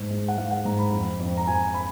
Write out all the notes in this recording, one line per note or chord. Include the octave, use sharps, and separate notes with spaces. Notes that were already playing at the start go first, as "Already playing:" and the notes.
Already playing: G#2
G#3
F#5
G#3 F5
F#5
G#2 A#5
B5
F2
F2
A#5
F2 G#5
B5